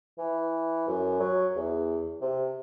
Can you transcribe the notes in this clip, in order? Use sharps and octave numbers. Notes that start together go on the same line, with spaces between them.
E3
F#2
F#3
E2
C3